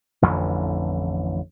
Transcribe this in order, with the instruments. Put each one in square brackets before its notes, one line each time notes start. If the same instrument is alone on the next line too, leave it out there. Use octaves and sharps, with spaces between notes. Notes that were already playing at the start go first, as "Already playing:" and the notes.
[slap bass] A1 F2 D3 E3